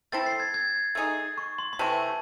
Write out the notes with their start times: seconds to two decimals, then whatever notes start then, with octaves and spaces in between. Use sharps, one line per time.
0.12 A3 C4 E4 A4 A6
0.26 C7
0.32 A6
0.40 G#6
0.54 G#6
0.95 A3 D#4 G#4
1.38 C#6
1.58 C6
1.73 C6
1.79 C3 E3 A3 A5